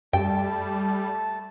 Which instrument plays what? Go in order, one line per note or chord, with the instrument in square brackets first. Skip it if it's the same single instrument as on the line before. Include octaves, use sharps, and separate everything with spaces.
[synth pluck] F#2 [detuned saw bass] G3 [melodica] A3 A5 [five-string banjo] G5